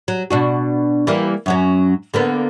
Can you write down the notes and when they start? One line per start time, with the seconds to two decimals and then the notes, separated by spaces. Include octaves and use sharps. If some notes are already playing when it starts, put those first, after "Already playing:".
0.08 F#3
0.31 B2 D4 F#4
1.07 E3 G3 A#3
1.46 F#2 F#3 C#4
2.14 D3 A#3 B3